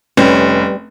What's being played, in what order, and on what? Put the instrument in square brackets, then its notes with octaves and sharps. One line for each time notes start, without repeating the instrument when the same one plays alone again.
[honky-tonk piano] F1 C#4 [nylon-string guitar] G3 B4